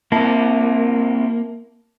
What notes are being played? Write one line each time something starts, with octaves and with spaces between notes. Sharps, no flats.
C3 A#3 E4 A#4 E5 A5